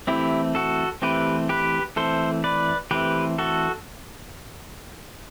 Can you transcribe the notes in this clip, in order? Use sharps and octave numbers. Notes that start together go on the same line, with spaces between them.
E3 A3 C4 E4 G4
F#4 A4
E3 A3 C4 G4 B4
G4 B4
E3 A3 C4 A4 C5
B4 D5
E3 A3 C4 G4 B4
F#4 A4